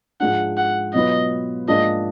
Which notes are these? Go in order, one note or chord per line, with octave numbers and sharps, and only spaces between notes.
G#2 F3 G#3 D4 F#5
F#5
B2 F#3 B3 F4 B4 D#5
G#2 F3 A#3 D4 G#4 D#5